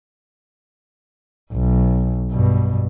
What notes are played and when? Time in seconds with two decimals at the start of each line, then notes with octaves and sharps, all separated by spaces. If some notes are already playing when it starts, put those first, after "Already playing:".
1.53 B1
2.31 G2 B2